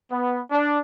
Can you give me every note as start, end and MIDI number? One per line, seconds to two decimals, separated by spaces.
0.11 0.40 59
0.51 0.79 62